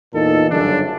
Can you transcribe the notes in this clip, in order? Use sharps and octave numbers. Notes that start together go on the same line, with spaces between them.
E2 A#2 D#4 A4
G1 F#2 C#3 D4